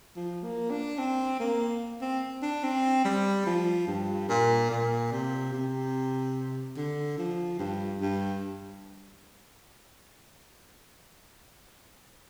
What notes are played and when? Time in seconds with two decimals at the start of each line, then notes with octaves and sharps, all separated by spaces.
0.16 F3
0.44 A#3
0.71 D4
0.98 C4
1.40 A#3
2.01 C4
2.43 D4
2.64 C4
3.05 G3
3.46 F3
3.87 G2
4.29 A#2
4.70 A#2
5.12 C3
5.52 C3
6.77 D3
7.18 F3
7.59 G2
8.01 G2